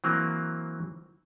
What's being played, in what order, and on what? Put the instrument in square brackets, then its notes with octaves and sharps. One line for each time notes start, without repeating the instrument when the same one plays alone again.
[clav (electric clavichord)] E3 F#3 A#3 C4